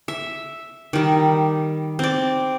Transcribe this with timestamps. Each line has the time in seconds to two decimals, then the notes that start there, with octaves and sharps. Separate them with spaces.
0.08 E5
0.93 D#3 G3
1.99 C4 D5